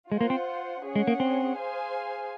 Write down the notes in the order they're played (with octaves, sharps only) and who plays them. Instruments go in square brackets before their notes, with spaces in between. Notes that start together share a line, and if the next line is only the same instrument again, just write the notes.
[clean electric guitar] G#3 [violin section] F4 C5 F#5
[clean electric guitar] A#3
C4
[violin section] C#4 G#4 C#5 F#5
[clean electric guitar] G#3
A#3
C4
[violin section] G#4 C5 F5 G#5